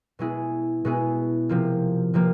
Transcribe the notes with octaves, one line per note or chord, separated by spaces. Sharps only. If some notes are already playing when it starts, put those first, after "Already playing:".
B2 G#3 B3 E4 G#4
B2 G#3 B3 E4 G#4
C3 F3 A#3
C3 F3 A#3